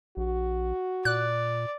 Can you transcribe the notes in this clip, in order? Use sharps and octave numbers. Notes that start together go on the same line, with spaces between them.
A#1 F#4
A#2 D5 F#6